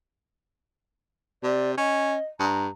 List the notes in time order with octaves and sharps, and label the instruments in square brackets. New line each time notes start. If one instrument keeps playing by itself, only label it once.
[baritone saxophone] C3 [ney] D5
[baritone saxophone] C#4 [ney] D#5
[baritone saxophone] G2 [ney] A#5